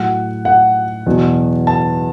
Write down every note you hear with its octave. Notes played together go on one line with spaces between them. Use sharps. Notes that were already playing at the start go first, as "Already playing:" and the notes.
Already playing: A2 F#3 F#5
F#5
E2 B2 F#3
A5